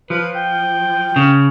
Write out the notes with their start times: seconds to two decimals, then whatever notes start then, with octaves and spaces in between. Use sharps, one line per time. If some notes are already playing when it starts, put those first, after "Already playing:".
0.10 F3 B4
0.36 G5
1.16 C#3